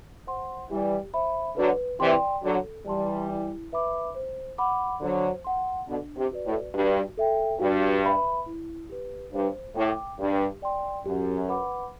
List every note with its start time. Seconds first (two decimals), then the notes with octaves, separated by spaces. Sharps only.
0.27 C5 F#5 C6
0.70 E3 G3 G4
1.13 C5 E5 B5
1.56 D3 F#3 B4
2.00 C3 E3 D5 G5 C6
2.43 D3 F#3 A4
2.86 E3 G3 D5 A5 C6
3.29 E4
3.72 B4 E5 B5 D6
4.15 C5
4.58 F#5 B5 D6
5.01 D3 F#3 C5
5.44 F#5 C6
5.88 B2 D3 D4
6.17 C3
6.31 F#4 B4 D5
6.45 A2
6.74 G2 F#4
7.18 A4 E5 G5
7.60 G2 F#4
8.03 B4 E5 B5
8.46 E4
8.89 G4 B4
9.33 G2 C5
9.76 A2 G5 D6
10.19 G2 G4
10.62 D5 G5 C6
11.06 F#2 G4
11.48 B4 F#5 B5 D6